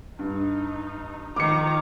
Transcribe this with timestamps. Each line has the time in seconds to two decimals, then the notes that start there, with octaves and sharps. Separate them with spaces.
0.19 G2 D#4
1.36 D#3 F3 A#5 D6 C#7